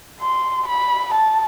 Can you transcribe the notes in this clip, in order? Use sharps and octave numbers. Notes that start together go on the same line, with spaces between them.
C6
B5
A5